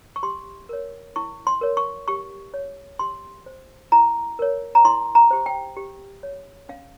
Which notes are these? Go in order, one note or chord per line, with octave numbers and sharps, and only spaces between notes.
C#6
G4 C6
A#4 C#5
E4 C#6
C6
A#4 C#5
C#6
G4 C#6
C#5
G4 C6
C5
E4 A#5
A#4 C#5
A#5
E4 C6
A#5
G4 C5
G5
G4
C#5
C#4 F5